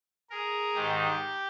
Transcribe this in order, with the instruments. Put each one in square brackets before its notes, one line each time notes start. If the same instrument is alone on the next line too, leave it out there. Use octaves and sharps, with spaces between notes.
[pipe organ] G#4 A#4
G#2 D#3 G4